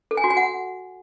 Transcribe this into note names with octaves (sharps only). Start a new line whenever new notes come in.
A4
G#5
F#4
G#5
F#5